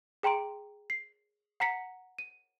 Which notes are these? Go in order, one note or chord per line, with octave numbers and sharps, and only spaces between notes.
G#4 G5 A#5 C6 D7
C7
F#5 A#5 B6 C#7
D#7